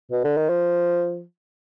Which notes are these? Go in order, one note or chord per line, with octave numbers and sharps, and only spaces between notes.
B2
D3
D#3
F3